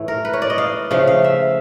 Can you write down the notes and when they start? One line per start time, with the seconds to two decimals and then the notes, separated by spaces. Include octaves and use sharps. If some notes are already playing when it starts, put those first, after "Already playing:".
Already playing: A2 E3 A3
0.08 A#4
0.25 B4
0.33 C#5
0.42 D5
0.50 D#5
0.58 F5
0.91 C#3 F3 A3 F5
1.07 F5
1.24 E5